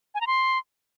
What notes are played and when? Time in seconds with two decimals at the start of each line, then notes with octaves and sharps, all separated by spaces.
0.15 G#5
0.21 A#5
0.27 C6